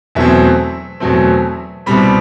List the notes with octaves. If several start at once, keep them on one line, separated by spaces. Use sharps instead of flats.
E2 B2 F#3 A3 C4 E5
E2 B2 F#3 A3 C4
C2 B2 G3 C4 B5